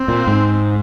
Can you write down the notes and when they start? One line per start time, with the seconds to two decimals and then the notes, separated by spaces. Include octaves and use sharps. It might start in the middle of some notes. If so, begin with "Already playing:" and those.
Already playing: C4
0.08 A#2
0.28 G#2